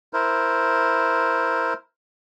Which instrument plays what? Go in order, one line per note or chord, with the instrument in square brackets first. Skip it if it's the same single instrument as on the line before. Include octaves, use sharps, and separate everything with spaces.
[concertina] E4 A#4 C5